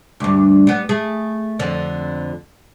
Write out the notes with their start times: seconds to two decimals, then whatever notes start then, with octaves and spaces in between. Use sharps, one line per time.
0.20 D2 G2
0.67 G3 B3
0.89 A3 G#4
1.59 F2 D3